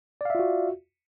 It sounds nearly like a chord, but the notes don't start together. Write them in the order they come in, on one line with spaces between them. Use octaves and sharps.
D5 F5 E5 F4 F#4